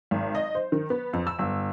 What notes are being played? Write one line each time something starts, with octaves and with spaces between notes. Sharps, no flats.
G#1
D#5
C5
D#3
B3
F2
E6
G1